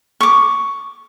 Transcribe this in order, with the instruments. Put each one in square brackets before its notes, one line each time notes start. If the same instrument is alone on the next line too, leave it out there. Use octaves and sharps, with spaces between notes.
[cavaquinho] C#6 D6